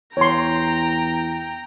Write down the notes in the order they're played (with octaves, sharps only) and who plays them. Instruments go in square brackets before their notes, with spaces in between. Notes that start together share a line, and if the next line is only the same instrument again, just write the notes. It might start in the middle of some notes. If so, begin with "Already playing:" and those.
[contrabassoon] E2 [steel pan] C#5 C6 [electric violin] G5 A#5